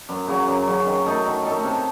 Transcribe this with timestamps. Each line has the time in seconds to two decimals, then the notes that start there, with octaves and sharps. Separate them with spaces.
0.09 F#2
0.27 C#3 F#3
0.48 F#2
0.67 C#3 F#3
0.86 D#3
1.06 A3 D#4 A4
1.25 D#3
1.45 A3 D#4 A4
1.63 C3